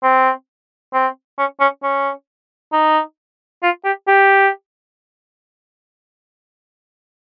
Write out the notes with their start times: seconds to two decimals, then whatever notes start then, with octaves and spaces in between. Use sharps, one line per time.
0.03 C4
0.93 C4
1.39 C#4
1.60 C#4
1.83 C#4
2.73 D#4
3.63 F4
3.85 G4
4.08 G4